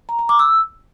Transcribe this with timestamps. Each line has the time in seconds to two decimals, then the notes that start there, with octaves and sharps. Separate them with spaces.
0.09 A#5
0.19 A#5
0.29 D6
0.39 E6